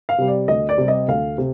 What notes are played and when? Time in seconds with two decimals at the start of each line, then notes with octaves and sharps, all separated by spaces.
0.09 F5
0.18 C3 G3
0.28 D5
0.48 D2 D#5
0.69 D5
0.78 C3 G3
0.88 D#5
1.08 D2 F5
1.38 C3